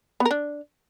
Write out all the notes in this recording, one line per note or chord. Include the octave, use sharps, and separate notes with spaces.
B3
A#4
D4